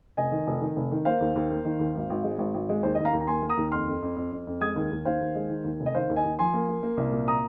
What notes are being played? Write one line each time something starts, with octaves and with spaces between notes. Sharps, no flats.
F1 D#5 G#5
D#3
F1
D#3
F1
D#3
A#3 C5 F5
D#2
D#2
A#3
D#3
D#2
G#1
G#1
G#3
G#1
G#1
G#3
D#2 C5
D#5
D#2
F5 A#5
D#2
A#5
A#3 G#5 C6
A#3
A#5 D#6
D#2
F2 C6 F6
F2
F2
F2
F2
F2
G#3 D#6 G#6
D#2
D#2
D#2 C5 F5
D#2
G#3
D#3
D#2
F1
D#5
D#3 C5 F5
D#2
D#5 G#5
D#2
F3 G#5 C6
A#3
A#3
A#3
C2
A#2
A#5 D#6